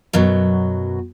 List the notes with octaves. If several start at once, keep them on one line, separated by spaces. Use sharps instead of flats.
F#2 B2 F#3